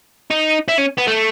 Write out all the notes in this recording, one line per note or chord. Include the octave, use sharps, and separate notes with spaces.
D#4
E4
C#4
B3
A3